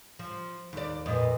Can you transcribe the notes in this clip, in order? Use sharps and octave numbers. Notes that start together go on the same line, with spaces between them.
F3
D#2 D5
F2 A#2 B4 D#5